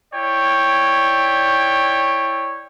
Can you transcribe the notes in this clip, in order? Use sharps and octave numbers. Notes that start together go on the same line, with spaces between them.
E4 C#5 D5 G5